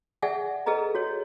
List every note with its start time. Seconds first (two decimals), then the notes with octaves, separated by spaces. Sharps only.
0.22 G#4 D5 E5 F#5 G#5
0.66 G#4 A4 B4 D#5 A#5
0.95 F#4 C#5